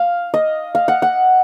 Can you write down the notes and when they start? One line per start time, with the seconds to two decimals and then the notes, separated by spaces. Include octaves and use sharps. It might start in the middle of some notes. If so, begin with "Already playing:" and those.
Already playing: F5
0.34 D#5
0.75 F5
0.88 F#5
1.02 F#5